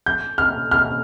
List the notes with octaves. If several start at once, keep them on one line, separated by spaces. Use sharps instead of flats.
G6
F6
F6